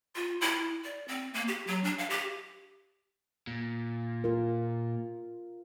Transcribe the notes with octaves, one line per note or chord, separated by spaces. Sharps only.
F4
E4
D5
C4
A#3
G4
F#3
D4
F5
G4
A#2
F4 A#4